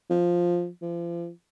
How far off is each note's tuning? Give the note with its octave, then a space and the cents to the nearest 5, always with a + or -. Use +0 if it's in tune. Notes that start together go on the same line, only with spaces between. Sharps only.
F3 +5
F3 -35